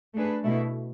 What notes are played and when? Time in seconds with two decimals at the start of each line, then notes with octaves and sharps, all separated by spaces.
0.15 A3 D4 G#4 B4
0.44 B2 A3 E4